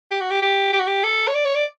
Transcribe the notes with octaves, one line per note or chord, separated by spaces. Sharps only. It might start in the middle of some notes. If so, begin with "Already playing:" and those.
G4
F#4
G4
G4
G4
F#4
G4
A4
C#5
D5
C#5
D5